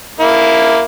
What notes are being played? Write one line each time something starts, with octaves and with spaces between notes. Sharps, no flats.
A#3 E4